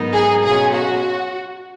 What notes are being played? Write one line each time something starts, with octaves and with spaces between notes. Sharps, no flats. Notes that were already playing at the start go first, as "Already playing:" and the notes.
Already playing: G#2 F#3 B3 D#4 A#4
G#4
B2 F#3 C#4 F4 G#4
F#4